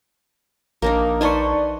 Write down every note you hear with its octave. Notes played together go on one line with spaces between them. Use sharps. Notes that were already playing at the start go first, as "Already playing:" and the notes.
A#1 A#3 D4 D#4
D#4 B4 C5 D5 G#5 A5 C#6